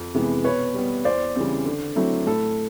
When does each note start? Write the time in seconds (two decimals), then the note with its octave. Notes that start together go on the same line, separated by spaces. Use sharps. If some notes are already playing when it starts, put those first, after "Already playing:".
Already playing: F2
0.14 C3 E3 G#3 B3
0.44 B2 B4 C#5
0.74 G3 B3
1.05 E2 C5 D5
1.36 C#3 E3 G3 C4
1.65 D3
1.96 F#3 A3 C4 E4
2.26 A2 A4